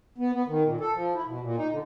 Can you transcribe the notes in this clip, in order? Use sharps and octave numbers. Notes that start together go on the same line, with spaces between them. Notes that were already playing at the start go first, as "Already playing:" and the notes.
B3
B3
D#3
A#2
A4
F3
E4
B2
A#2
D#4
D3